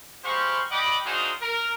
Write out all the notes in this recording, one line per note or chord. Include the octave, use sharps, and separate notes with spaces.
G#3 G4 C5 F5 B5 C#6
D5 D#5 F#5 G5 B5 D6
D4 D#4 F4 F#4 G#4 C5
A#4